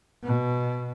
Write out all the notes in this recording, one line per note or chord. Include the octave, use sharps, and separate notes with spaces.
B2